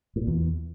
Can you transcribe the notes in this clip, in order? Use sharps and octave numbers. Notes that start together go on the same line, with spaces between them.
A2
A#2
E2